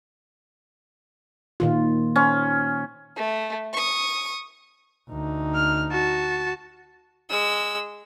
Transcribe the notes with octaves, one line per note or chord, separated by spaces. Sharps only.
A#2 D#3 F4
C#4
A3
C#6 D#6
D2 D#4
F6
F#4 A5
G#3 E6